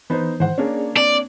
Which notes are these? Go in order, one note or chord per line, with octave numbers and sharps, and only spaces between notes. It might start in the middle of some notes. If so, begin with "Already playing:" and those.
E3 B3 D#4 C5
G#2 D#3 E3 C5 F#5
A#3 C#4 D4 G#4 C#5 D5
C4 D5